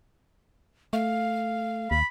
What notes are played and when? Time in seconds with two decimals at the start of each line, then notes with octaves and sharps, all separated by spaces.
0.93 A3 F5
1.91 D#2 B5